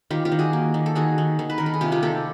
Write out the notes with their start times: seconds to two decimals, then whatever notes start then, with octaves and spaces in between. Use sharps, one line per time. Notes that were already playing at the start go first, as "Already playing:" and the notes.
0.10 D#3 F4 G4
0.25 F4 G4
0.32 D#3
0.39 F#4 G#4
0.53 A#3
0.74 D#3
0.86 A4
0.95 D#3 F#4 G#4
1.18 D#3
1.39 D#3
1.50 B4
1.58 D#3 A#4
1.66 A4
1.74 G#4
1.81 C3 F4 G4
1.92 F4 G4
2.03 D#3 G4 A4